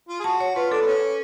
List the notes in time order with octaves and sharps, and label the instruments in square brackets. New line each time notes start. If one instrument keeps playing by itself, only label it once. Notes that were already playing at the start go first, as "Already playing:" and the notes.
[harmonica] F4
G#4
[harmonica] F#4 [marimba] A5
[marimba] C#5
[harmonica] F4 [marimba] B4
[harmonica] D4 [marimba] A4
[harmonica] B3
C#4